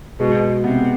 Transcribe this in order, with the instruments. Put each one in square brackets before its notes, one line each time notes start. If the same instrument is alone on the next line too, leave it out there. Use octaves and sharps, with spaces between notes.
[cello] B2 [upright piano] G#3
[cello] C3 [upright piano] B3